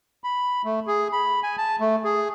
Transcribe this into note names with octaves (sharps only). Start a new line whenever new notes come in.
B5
A3
G#4
B5
G#5
A5
A3
G#4